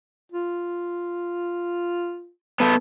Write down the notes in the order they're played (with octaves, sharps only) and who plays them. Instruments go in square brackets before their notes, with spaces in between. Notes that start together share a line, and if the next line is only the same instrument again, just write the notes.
[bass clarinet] F4
[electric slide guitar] B3 A4